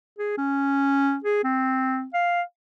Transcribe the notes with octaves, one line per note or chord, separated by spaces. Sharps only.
G#4
C#4
G#4
C4
F5